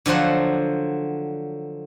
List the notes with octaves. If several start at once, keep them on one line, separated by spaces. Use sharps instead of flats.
D3 F3 F#3 C5 F#5